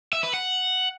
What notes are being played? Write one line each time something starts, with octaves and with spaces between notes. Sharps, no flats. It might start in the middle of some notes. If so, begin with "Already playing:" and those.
E5
B4
F#5